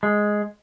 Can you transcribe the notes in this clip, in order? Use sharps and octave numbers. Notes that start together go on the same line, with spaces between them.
G#3